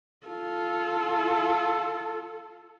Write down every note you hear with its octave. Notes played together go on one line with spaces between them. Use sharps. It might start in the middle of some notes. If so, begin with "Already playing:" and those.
F4 A4